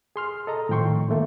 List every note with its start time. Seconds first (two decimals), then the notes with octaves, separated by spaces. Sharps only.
0.16 G#4 C6 F6
0.47 A4 D#5 A#5
0.69 A2 D#3 F3 G5 C6 C#6
1.09 D3 D#3 A3 A#3